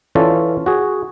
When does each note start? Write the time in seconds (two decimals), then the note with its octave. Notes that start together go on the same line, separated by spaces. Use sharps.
0.15 E3 C#4 F4 A4 D5
0.66 F#4 G#4